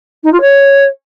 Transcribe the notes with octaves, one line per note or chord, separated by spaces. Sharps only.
D#4
F4
C#5